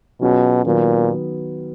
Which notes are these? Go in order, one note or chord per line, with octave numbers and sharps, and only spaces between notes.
B2 F#3 C#4 F4 G#4
A#2 D#3 F#3 B3